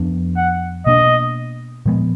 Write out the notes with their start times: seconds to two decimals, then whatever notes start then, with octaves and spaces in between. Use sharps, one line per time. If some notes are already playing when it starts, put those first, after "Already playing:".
Already playing: F2 F3 B3 D4
0.37 F#5
0.86 B2 A#3 D4 D#5
1.86 A#2 F3 G#3 B3